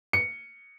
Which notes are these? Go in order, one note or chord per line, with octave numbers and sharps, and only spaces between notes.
C#7